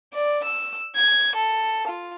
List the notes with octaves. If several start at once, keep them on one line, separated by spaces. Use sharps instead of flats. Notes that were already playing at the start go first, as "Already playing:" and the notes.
D5
E6
G#6
A4
F4